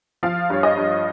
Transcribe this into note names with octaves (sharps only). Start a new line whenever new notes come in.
F3 F5
G2 C#5
D#5
G2